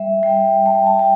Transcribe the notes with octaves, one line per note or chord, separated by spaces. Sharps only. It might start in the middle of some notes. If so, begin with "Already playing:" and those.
Already playing: G3 E5
G3 G5
G3 A5
A5
G5